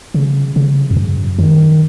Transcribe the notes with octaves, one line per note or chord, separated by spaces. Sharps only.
C#3
C#3
F2
F#2
D#3